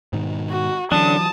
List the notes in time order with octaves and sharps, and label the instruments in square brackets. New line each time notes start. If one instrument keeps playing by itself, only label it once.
[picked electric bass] G#2 B2 D#3
[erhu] F#4
[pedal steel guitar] D3 C#4 D4 [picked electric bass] E3 F#3 [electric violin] A5 [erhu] D#6